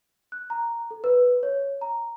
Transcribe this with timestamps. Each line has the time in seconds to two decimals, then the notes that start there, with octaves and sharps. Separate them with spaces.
0.32 F#6
0.50 A#5
0.91 A4
1.04 B4
1.43 C#5
1.81 A#5